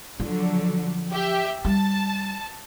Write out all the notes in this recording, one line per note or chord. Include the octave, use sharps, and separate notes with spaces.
D3 F3 F#3
G4 E5
G3 A5